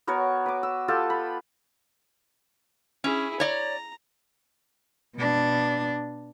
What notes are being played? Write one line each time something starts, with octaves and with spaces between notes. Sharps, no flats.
B3 F#4 A#4 C#5
B4 D6
E6
F4 G4 A4 A5
B5
C#4 E4 G#4
C#5 D5 A#5
B2 D4